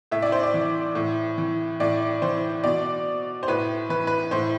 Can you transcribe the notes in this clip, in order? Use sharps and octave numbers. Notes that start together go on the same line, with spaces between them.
A2 E5
D5
C5
D5
E3
A2
E3
A2 D5
E3 C5
B2 D5
C5
A2 B4
E3 B4
B4
A2 C5